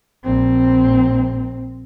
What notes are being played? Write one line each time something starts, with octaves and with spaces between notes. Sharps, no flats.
A#1 C4